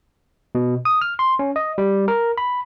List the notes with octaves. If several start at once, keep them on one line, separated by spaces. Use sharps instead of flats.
B2
D#6
F6
C6
C#4
D#5
G3
A#4
B5